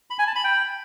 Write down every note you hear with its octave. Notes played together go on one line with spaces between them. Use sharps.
B5
G#5
A5
B5
G5